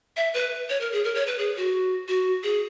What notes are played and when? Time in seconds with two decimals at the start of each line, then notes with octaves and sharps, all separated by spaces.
0.17 E5
0.34 B4
0.69 C#5
0.81 A#4
0.92 G#4
1.04 A#4
1.15 C#5
1.27 B4
1.38 G#4
1.57 F#4
2.08 F#4
2.43 G#4